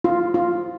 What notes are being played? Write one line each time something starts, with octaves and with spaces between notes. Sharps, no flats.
F4
F4